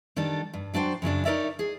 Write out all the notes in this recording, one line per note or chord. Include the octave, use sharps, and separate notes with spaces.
D#3 G3 D4 A4
G2
F#3 D4 F#4 C5 G5
F#2 C#3 F#3 D4
D#4 E4 A#4 C#5 D5 E5
G#4